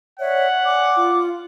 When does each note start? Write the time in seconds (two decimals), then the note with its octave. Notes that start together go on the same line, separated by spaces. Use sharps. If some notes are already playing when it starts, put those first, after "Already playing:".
0.19 C#5 D5 E5 F#5
0.65 D5 G#5 D6
0.96 F4